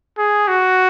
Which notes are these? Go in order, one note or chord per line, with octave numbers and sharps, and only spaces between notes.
G#4
F#4